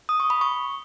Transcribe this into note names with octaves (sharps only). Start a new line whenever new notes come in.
D#6
C#6
B5
C#6